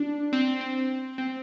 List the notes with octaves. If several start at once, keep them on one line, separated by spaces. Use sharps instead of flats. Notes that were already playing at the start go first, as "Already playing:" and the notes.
Already playing: D4
C4
C4
C4